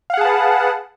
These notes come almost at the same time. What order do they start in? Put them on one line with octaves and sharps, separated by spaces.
F5 F#5 G#4 A5 B4